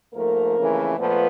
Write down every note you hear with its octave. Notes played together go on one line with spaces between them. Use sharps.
G#2 F3 A3 A#3 A#4
F2 C#3 E3 A3
A#2 F3 A3 B3 B4